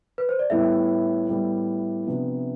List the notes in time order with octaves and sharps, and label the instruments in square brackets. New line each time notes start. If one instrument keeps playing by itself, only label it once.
[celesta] B4
C5
D5
[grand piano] A2 G3 B3 E4 A4 [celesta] E5
[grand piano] A2 G3 B3 E4 A4
C3 F3 B3 D4